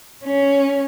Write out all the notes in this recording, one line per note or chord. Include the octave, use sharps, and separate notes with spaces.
C#4